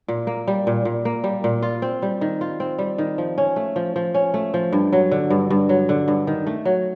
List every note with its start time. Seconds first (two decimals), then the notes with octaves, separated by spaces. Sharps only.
0.08 A#2
0.27 A#3
0.47 G3
0.67 A#2
0.85 A#2
1.05 A#3
1.24 G3
1.44 A#2
1.62 F4
1.82 C4
2.02 G3
2.21 D#3
2.41 F4
2.60 C4
2.78 G3
2.98 D#3
3.18 F3
3.38 C#4
3.56 A3
3.76 F3
3.96 F3
4.14 C#4
4.34 A3
4.54 F3
4.72 G2
4.93 F#3
5.11 D3
5.30 G2
5.50 G2
5.69 F#3
5.89 D3
6.08 G2
6.27 D#3
6.47 A3
6.65 F#3